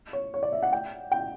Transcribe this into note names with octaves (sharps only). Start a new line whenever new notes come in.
C#5
C#5
D5
E5
F#5
G5
G5